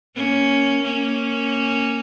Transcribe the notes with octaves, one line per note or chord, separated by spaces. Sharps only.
A#3 C#4
A#3 C#4